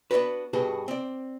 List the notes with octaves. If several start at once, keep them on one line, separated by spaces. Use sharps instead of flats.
B3 D4 F4 F#4 B4
G2 B2 F#4 G#4 B4
C4 D5